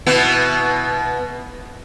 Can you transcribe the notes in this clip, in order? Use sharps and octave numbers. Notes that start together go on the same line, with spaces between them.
B2 B3 E4